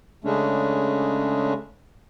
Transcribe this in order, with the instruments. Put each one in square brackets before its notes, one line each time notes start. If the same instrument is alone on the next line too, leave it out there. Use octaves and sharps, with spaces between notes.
[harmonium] C#3 G#3 A3 C#4 D4